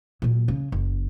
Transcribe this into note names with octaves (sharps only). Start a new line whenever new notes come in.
A#2 F#3
C#3
F#1